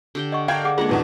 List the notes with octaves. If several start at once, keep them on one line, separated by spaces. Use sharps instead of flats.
D3 G4 G5
D#5 F#5 C#6
D4 A#4 F5 G5 G#6
G#4 F#5 D6
G#3 A#3 D4 F4 G#4 F#5
E2 B2 D#3 E4 B4 D5